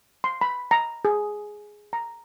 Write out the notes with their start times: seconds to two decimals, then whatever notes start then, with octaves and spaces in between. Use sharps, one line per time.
0.24 C6
0.41 B5
0.71 A#5
1.05 G#4
1.93 A#5